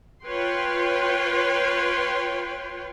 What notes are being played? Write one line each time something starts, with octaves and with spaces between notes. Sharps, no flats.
F4 B4 C#5 G5 C6